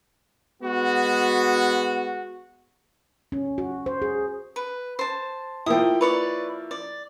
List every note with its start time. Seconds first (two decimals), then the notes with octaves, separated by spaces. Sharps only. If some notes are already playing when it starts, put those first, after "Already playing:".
0.63 G#3 B3 F#4
3.32 C#4
3.58 F#4
3.86 C5
4.02 G#4
4.56 B4
4.99 C5 A5
5.66 F3 A#3 E4 G5 D#6
6.01 B4 C#5 D5
6.71 D5